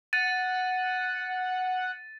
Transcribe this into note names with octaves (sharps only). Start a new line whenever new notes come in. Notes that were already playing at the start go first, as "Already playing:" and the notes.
F#5 A6 D#7